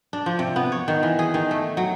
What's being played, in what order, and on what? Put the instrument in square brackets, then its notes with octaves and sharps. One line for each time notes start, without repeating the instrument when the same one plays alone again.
[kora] D4
F3
C3
B3
C#5
D#3
E3
G#4
D#3
A3
F#3